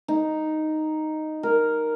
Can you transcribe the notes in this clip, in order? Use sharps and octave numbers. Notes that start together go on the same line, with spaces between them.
D#4
A#4